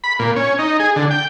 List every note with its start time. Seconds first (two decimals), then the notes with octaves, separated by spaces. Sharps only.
0.04 B5
0.19 A#2
0.36 C#4
0.59 D#4
0.80 G#4
0.96 D3
1.11 G5